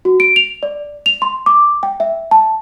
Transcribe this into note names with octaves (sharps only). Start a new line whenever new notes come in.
F#4
D7
F7
D5
F7
C6
D6
G5
E5
A5